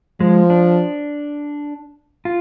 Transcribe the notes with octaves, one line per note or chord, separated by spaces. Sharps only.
F3 G#3
D4
F4